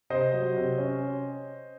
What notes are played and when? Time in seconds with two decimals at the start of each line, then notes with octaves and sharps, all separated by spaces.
0.10 C3 C5 D#5
0.33 F#3
0.56 C3
0.78 C#4